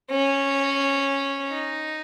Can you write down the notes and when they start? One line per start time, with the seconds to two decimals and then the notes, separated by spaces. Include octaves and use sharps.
0.10 C#4
1.50 D#4